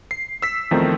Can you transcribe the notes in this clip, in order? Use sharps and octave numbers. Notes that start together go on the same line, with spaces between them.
C7
E6 B6
E2 D#3 F3 A3 C4 D#4